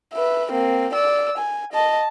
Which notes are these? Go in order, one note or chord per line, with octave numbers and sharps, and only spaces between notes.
B4 E5
A#3 C4
D5 E6
G#5
D#5 A5